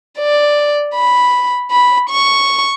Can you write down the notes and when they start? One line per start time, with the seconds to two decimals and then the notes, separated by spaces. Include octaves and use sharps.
0.18 D5
0.95 B5
1.71 B5
2.09 C#6